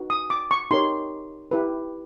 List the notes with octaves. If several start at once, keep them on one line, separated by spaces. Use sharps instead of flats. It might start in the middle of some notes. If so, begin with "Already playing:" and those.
Already playing: D#4 F#4 B4
D#6
D6
C#6
D#4 G4 A#4 C#5 C6
E4 G4 B4